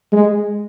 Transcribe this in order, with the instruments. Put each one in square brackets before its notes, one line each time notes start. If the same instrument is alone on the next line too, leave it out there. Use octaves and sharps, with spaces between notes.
[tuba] G#3